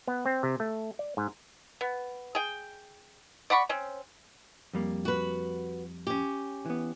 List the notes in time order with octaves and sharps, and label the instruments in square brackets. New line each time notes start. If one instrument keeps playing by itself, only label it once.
[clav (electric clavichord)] B3
C4
C3
A3
D5
G#2
[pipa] B3
G#4 G5
D5 F#5 B5 C#6
C4 C#4
[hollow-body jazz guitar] F2 G3 A#3
[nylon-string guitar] F#4 B4
C#4 G4
[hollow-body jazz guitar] E3 B3